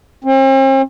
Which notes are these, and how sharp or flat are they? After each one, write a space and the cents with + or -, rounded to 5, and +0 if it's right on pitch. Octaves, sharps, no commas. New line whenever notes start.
C4 +45